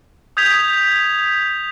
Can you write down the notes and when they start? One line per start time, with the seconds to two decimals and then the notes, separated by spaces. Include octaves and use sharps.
0.37 D#6 G6 G#6 B6 F7